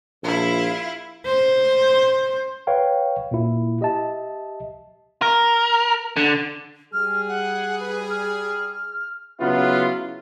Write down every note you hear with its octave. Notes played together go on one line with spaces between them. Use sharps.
A#1 E4 F4
C5
B4 C#5 F5 G5
A#2 A#3 E4
G4 D#5 E5 A5
A#4
D3
G3 G#4 F6
F#5
B4
F6
C#3 F#3 B3 E4 F4